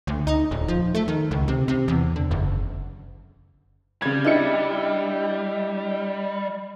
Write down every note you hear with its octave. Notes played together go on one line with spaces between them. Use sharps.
D2
D#4
D#1
F3
A3
D#3
C#2
C3
C3
E2
D3
F#1
C#3 G3 G#6
D4 E4 D#5 G5 C#7